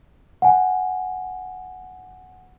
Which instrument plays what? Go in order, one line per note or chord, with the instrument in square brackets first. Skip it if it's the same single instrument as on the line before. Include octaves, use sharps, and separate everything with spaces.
[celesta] F#5 G#5